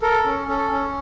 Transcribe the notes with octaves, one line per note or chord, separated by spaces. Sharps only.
A4 A#4
C#4
C#4 A4
C#4